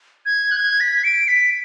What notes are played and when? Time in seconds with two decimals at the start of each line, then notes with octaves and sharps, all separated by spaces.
0.26 G#6
0.51 F#6
0.56 G#6
0.80 B6
1.04 D7
1.28 B6